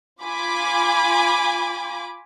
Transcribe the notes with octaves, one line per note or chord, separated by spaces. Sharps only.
F4 G#5 B5 D6